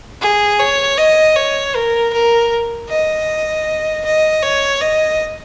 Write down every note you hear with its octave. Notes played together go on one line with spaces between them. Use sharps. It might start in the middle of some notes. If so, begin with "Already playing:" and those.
G#4
C#5
D#5
C#5
A#4
A#4
D#5
D#5
C#5
D#5